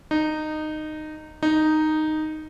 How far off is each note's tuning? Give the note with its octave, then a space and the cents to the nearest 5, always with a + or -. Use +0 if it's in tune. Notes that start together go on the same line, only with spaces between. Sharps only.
D#4 -15
D#4 -5